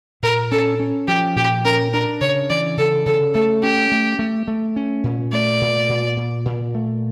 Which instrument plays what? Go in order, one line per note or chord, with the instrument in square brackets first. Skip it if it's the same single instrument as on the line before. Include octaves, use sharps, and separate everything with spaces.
[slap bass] A#2 [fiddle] A#4
[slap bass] C#4 [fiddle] A4
[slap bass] C#4
[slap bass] F3 [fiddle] G4
[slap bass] A#2 [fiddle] G4
[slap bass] C#4 [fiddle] A#4
[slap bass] D4 [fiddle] A#4
[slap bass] C#3 [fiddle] C#5
[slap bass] E3 [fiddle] D5
[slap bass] C#3 [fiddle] A4
[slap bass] C#3 [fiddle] A4
[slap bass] A3 [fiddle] A4
[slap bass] C#4 [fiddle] G4
[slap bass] A3
A3
A3
C#4
A#2
[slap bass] A3 [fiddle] D5
[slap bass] A#2
A#2
A#2
A#2
A3